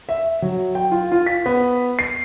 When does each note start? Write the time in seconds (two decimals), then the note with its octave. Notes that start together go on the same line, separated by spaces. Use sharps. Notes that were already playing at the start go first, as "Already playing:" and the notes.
0.09 E5
0.42 F#3
0.75 G5
0.92 F4
1.12 F4
1.26 B6
1.46 B3
1.99 C7